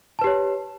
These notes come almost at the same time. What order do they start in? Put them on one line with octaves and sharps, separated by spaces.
A5 B4 G4 C#5